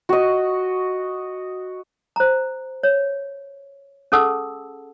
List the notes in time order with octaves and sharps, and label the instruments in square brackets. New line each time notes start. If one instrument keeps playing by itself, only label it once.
[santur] F#4 D#5
[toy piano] C5 A#5
C#5
C#4 G#4 A4 F#5 A5 E6